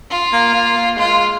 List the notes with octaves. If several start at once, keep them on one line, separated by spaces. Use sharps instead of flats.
F4
A#3
A#3
A#3
G#3 F4